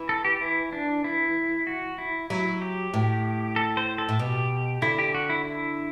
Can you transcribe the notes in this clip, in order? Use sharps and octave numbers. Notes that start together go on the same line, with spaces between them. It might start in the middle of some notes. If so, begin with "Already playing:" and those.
Already playing: E3
A4
G4
E4
D4
E4
F#4
E4
F#3 E4
G4
A2
A4
C5
A4
A2
B2 G4
D3 E4
G4
F#4
E4
E4